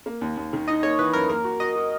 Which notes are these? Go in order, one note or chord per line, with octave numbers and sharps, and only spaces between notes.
A#3
D#2
D#2
D#3
D#4 D#5
A#3 C#5
E3 B4
F#2 A#4
A#3 A#4
F#4
F#4 D#5
F#4